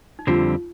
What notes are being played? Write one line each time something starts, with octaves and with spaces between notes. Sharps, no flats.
D#4
F2 D3 G3 C4 F4